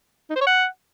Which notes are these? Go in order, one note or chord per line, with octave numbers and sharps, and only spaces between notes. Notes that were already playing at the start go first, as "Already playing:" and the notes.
D#4
C5
C#5
F#5